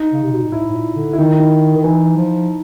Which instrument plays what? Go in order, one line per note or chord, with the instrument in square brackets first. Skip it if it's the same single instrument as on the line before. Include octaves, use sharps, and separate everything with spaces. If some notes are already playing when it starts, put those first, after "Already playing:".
Already playing: [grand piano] D#4
[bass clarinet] C#3
C3
B2
A#2
[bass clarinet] A2 [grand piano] E4
[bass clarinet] A2
A#2
D3
[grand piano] E4
[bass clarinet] D#3 [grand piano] D#4
[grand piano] E4
D#4
[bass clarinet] D#3
[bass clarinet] E3 [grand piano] D#4
[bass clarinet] F3